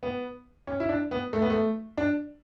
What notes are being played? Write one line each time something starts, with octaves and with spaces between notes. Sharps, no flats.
B3
C#4
E4
D4
B3
A3
B3
A3
D4